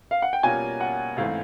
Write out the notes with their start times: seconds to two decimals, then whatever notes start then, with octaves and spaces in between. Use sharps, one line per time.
0.11 F5
0.22 F#5
0.33 G5
0.43 B2 G3 A#3 C#4 F4 G#5
0.81 F#5
1.16 A1 G#2 E3 A3 C4 F5